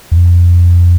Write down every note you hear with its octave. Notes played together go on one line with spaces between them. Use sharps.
E2
F2